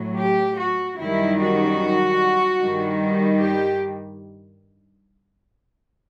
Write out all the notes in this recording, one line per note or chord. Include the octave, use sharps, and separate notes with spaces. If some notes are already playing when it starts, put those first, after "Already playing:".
Already playing: A2 F#3
G4
F#4
F#2 D#3 G3 E4
F#4
G2 D#3 G3
G4